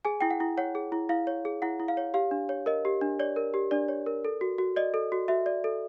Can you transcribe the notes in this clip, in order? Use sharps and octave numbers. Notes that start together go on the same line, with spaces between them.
G#4 G#5
E4 G5
F#5
E4
C#5 F#5
G#4
E4
E4 F5
C#5
G#4
E4 F#5
E4
F5
C#5
G4 F5
D4
C#5
A#4 D#5
G4
D4
C#5 D5
A#4
G4
D4 D5
C#5
A#4
A4
F#4
F#4
D5 D#5
A4
F#4
F#4 E5
D5
A4